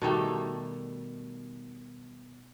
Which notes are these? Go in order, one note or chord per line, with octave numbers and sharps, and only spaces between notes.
B2 D#3 G3 A3